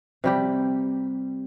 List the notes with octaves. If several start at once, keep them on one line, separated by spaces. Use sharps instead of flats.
C3 G3 G4